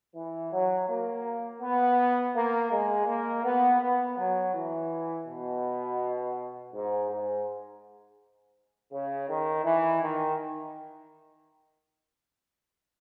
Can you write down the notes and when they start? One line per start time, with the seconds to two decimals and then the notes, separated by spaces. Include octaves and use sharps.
0.15 E3
0.52 F#3
0.88 A#3
1.61 B3
2.35 A#3
2.71 G#3
3.07 A#3
3.44 B3
3.80 B3
4.17 F#3
4.54 E3
5.27 B2
6.73 G#2
7.09 G#2
8.92 C#3
9.29 D#3
9.64 E3
10.02 D#3